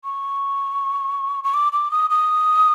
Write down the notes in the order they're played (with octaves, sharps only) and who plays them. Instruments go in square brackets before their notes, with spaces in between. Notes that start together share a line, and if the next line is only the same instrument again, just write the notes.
[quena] C#6
C#6
D6
D6
D#6
D#6